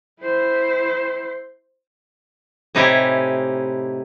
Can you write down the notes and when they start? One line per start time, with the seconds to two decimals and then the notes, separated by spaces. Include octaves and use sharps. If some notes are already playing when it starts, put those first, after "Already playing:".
0.20 E4 C5
2.75 A2 C3 D#4 E4 G4 G#5